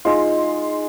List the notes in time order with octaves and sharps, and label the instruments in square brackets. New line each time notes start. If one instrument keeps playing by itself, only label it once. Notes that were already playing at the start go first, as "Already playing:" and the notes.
[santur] G#3 D#4 F4